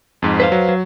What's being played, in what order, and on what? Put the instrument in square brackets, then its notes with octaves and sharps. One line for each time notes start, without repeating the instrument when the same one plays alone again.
[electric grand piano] F2 G#2
[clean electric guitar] B4 C5 F5
[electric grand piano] F#3
F#3